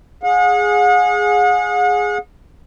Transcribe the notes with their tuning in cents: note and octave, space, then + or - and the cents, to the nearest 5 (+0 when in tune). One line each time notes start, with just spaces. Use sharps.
G#4 +0 F#5 -40